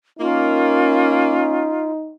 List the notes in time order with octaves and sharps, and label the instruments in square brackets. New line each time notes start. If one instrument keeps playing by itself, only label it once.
[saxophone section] A#3 [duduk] C#4 [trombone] D#4 [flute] F4